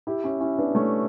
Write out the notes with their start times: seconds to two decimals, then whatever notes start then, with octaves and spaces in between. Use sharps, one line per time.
0.07 E4 G4
0.24 C#4 E4
0.40 C#4 E4
0.58 B3 D4
0.75 A3 C#4